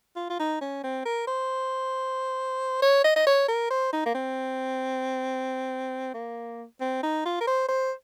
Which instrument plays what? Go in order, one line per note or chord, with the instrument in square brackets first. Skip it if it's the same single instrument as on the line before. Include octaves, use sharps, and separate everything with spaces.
[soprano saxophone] F4
F4
D#4
C#4
C4
A#4
C5
C#5
D#5
D#5
C#5
A#4
C5
D#4
A#3
C4
A#3
C4
D#4
F4
A#4
C5
C5